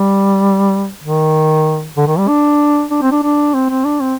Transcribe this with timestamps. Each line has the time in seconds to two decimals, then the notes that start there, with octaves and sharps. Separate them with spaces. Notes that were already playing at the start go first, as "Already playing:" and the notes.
Already playing: G3
1.04 D#3
1.97 D3
2.07 D#3
2.19 G3
2.28 D4
2.91 D4
3.02 C4
3.12 D4
3.23 D4
3.54 C4
3.69 C4
3.85 D4
4.01 C4